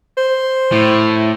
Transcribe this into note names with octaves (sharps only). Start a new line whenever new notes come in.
C5
A2